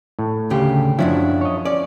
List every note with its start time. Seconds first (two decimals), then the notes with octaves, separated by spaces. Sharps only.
0.19 A2
0.50 D2 C#3 G4
0.99 F#2 F3 C#4 D4 E4
1.41 C#5 D#5
1.65 C#4 D5